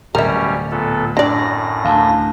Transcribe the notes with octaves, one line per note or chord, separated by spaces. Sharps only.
D1 B2 G3 C#4 A#4 E5
A#2 B3 A4
F#2 A2 D4 D5 A#6
D2 F5 A5